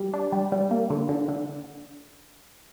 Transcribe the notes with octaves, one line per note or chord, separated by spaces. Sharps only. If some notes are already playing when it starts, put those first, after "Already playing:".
Already playing: G3
D4
G3
G3
A#3
D3
D3
D3